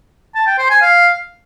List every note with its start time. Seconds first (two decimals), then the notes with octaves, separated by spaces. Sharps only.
0.35 A5
0.47 G5
0.58 C5
0.70 G#5
0.82 F5